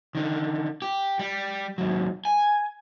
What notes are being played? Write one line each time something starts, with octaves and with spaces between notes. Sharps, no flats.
D3 D#3
G4
G3
D#2 F#3
G#5